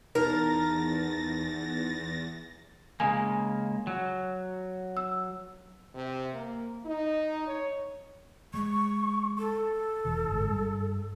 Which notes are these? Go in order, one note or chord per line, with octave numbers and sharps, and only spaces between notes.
E2 D#4 A#4 A6 A#6
C#3 G#3 A#3 G#5
F#3
E6
C3
A#3
D#4
C#5
G#3 C#6
A4
E1 E3
G1 G#2
G2 G3